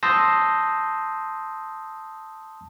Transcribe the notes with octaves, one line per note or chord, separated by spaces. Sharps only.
A5 C6 D#6 E6 G6 A#6